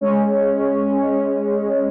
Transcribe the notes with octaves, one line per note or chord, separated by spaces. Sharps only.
G#3 C#4